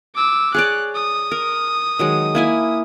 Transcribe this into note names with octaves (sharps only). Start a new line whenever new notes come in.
D6 E6
G#4 C#5 D5 F#6
D#6
A#4
D#3 F#3 G#3
A#3 E4 G#5